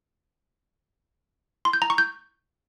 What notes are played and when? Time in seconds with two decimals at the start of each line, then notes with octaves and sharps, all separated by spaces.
1.65 C6
1.73 G6
1.82 A#5
1.90 C#6
1.98 G6